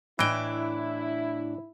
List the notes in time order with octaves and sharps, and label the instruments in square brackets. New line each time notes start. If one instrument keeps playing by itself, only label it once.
[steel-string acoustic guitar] A2 D4 [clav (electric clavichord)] E3 D#5 G5 [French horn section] E4